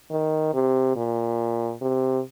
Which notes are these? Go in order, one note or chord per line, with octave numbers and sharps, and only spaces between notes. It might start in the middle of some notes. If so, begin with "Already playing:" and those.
D#3
C3
A#2
C3